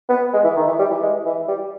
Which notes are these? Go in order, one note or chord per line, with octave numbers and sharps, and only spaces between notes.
B3
G#3
E3
D#3
E3
G3
E3
G#3
E3
G3